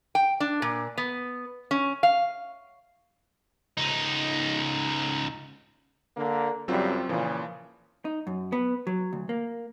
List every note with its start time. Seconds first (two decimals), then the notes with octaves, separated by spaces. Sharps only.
0.15 G5
0.40 D4
0.62 A#2
0.98 B3
1.71 C#4
2.03 F5
3.77 C#2 D#4
6.16 D3 A#3
6.68 F#2 C#3 F#3 G3 C4 F4
7.09 A#2 C#3 E3 F3
8.05 D#4
8.27 F#2
8.53 B3
8.87 F#3
9.13 D2
9.29 A#3